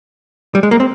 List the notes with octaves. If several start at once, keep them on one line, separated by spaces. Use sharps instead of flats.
G3
G#3
A#3
C4